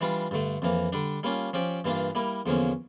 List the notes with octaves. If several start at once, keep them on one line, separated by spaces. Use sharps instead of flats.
E3 G3 D4 F4
G2 D3 A3
F2 E3 A#3
D3 G3 D4
G3 A#3 C#4 F4
F3 C#4 G4 D5
G2 E3 A#3 D4 F4
G3 A#3 E4 A#4
E2 D3 F3 A#3 C#4